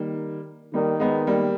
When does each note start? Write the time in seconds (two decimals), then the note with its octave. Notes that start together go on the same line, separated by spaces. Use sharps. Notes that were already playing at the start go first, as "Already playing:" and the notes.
Already playing: D#3 G3 A#3
0.74 D#3 G3 A#3
1.00 G#3 B3
1.27 G3 A#3